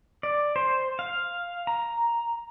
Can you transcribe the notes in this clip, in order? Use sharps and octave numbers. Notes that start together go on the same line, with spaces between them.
D5
C5
F5
A#5